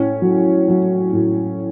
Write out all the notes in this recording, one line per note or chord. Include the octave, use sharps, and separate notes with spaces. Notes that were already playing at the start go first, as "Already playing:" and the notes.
Already playing: A2 C#4
F#3
F#3
A2